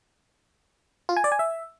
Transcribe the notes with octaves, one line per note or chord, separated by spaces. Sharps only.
F4
G#5
D5
G#5
E5